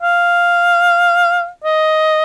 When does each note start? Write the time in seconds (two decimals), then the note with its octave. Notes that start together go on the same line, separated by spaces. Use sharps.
0.02 F5
1.64 D#5